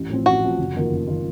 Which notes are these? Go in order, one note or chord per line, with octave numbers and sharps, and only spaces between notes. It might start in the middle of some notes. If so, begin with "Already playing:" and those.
Already playing: A1
A2 F3 C4
A1 F#4
A2 F3 C4
F#1
F2 D#3 A#3 F4
F#1
D#3 A#3 F4